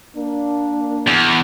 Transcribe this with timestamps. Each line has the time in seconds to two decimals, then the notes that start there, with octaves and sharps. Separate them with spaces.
0.15 A#3 D4
1.07 E2